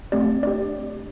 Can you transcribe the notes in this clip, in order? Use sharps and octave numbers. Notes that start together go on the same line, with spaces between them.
A3 C4 G4 D5
D4 G4 D5